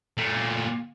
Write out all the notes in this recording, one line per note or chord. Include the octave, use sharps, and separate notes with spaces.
A#2 A3